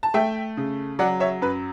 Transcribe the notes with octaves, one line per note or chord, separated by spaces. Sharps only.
A5
A3 E5 G5
C#3
F#3 D5 F#5
C#5 E5
F#2 B4